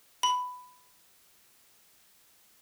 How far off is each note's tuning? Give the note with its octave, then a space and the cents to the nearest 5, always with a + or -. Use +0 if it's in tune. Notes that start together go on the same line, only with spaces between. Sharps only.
B5 +10